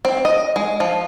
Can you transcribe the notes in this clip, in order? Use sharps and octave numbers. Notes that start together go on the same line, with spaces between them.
C4
D#5
G#3
F3